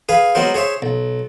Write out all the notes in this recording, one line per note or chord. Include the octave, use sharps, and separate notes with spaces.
G#4 B4 F5
F#3 G#3 B3 A#4 C5
G#4 C5 C#5 E5
B1